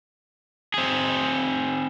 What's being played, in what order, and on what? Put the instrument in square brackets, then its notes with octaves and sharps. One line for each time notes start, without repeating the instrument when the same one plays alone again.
[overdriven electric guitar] C4 G#4